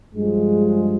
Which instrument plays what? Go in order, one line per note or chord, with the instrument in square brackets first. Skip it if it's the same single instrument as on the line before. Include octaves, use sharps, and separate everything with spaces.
[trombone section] G2 F3 G#3